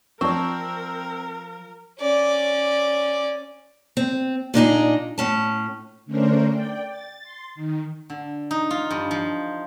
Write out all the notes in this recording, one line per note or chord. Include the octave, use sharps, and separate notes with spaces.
F3 C4 A#4 D5 A5 C#6
C#4 D5
C4
A#2 D4 D#4 G#4
A2 C#4 A5
D3 A3 C#4 D4 A#4 C5
D5 G5
A6
C6 A6
D#3
D3
D#4
F4
G2
F3